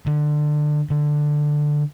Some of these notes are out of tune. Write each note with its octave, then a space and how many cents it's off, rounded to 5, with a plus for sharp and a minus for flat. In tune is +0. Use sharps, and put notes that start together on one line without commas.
D3 +25
D3 +10